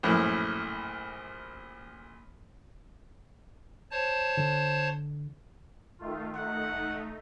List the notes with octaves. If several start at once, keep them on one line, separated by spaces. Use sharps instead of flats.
A#1 F#2 A2
C5 C#5 A5
D3
D#3 A3 F4
A3 D#4 F#5
E1